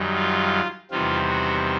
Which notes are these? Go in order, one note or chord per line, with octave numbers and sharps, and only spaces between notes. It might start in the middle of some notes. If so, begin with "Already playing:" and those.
Already playing: F#2 D#3 G3
F4
E2 C3 D#3 G3 C4 F4
F#4